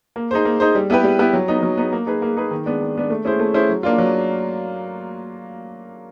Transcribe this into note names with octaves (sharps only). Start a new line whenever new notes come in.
A#3
D#4 G#4 C5
A#3
D#4 G#4 C5
G3
B3 E4 G4 B4
G3
B3 E4 G4 B4
F#3
B3 D#4
F#3
B3 D#4
A#3
D#4 G#4 B4
A#3
D#4 G#4 B4
D#3
G#3 B3 D4
D#3
G#3 B3 D4
A3
C#4 E4 G#4 C5
A3
C#4 E4 G#4 C5
F#3
A#3 D4 F4
F#3